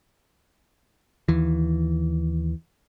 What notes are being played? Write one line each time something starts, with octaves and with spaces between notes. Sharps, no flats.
D#2 E3